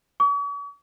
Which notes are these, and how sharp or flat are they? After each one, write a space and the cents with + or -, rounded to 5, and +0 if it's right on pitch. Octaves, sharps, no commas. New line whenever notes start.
C#6 +45